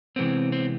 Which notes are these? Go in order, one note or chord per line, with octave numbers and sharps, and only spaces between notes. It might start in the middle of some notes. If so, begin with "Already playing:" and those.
C3 E3 G#3 B3 C4
C4